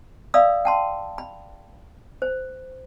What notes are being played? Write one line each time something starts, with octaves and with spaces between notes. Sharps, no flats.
D5 E5 F5 B5 D#6 E6
G5 A5 C6
B5
C5